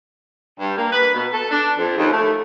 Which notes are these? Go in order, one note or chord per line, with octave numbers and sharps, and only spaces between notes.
G2
A#3
B4
B2
A4
D4
F2
D#2
A3